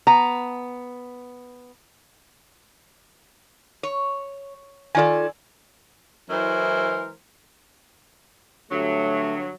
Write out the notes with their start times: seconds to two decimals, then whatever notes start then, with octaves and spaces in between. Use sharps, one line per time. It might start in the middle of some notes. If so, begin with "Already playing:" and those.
0.07 B3 A#5
3.83 C#5
4.95 D#3 F4 A4 D5 G#5
6.30 E3 F#3 G#3 E4 A#4 C5
8.71 G2 D3 F#3 A3